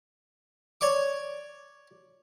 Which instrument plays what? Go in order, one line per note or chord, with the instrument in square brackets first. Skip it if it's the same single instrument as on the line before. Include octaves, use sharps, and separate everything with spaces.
[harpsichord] C#5 D5 C#6 D6